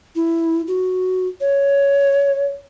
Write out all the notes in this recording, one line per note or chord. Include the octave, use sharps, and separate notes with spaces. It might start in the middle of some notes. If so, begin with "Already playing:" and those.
E4
F#4
C#5